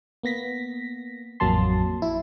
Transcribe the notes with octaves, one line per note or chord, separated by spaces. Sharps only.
A#3 B3 A#6 B6
A1 F2 F#3 A#3 A5 C6
E4